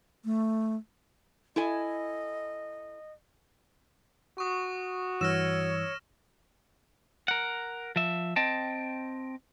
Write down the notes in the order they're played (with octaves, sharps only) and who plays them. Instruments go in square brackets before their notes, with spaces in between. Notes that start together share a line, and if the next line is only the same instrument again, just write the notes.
[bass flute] A3
[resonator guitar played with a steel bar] E4 A4 G#5 [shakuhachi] D#5
[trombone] F#4 [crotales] C#6 D#6
[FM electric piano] G2 E3 E6 [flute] C#5 [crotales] F6 A#6 E7
[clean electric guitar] A#4 F#5
F3 E5
C4 D#5 G5 A5